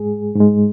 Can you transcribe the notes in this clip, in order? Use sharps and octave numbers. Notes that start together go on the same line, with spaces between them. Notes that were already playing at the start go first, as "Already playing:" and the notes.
Already playing: G#2 G#3 G#4
G#2
G#3